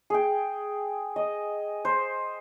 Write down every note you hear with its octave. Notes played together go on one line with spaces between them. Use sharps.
G#4 G5
D#5
C5